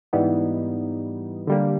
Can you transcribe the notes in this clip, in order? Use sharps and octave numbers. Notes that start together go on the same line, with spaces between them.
G#2 E3 G3 B3 D#4
D3 G3 A#3